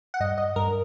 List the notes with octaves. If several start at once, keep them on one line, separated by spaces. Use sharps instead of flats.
F#5
G2 D#5
D#5
G2 A#4